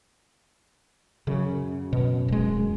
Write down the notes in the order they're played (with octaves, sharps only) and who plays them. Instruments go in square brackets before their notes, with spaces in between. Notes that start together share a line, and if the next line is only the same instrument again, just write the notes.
[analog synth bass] F#2 [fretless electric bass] C#3
[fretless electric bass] B2
D1 G#3